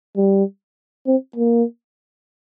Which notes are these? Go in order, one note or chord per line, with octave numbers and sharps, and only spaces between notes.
G3
C4
A#3